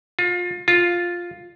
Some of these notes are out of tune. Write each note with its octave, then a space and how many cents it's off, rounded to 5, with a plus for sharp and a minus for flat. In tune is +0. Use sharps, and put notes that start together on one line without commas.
F4 +30
F4 +5